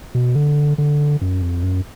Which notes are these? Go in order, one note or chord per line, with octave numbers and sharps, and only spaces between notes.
B2
D3
D3
F#2
F2
F#2